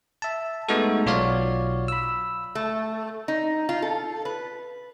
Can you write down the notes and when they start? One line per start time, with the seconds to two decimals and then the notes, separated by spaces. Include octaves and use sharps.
0.22 E5 A5
0.69 G#3 A3 B3 D#4 F#4 A4
1.06 B1 F4 F#4 C#5 D5 F5
1.88 B5 E6
2.55 A3
3.28 D#4
3.69 F4
3.82 A4
4.25 B4